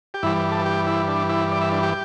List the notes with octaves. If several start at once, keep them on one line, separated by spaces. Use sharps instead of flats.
G4
G2 E3 G3 E4
A4
G4
E4
D4
E4
D5
E5
D4
G4